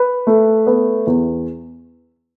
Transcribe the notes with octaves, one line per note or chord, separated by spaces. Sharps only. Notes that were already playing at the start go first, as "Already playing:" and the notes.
Already playing: B4
A3
B3
E2